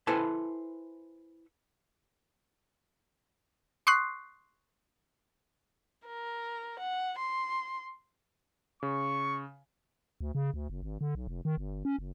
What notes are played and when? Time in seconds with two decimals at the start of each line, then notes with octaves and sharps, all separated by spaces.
0.07 E4 A4 B4 C5 G#5 A5
3.87 C6 C#6 D#6 F#6 C7
6.07 A#4
6.79 F#5
7.18 C6
8.83 C#3 C#6
10.21 D2
10.35 C#3
10.54 D2
10.70 F#1
10.83 G#1
11.01 D3
11.15 B1
11.27 F1
11.45 D#3
11.57 G1
11.85 C#4
11.98 F#1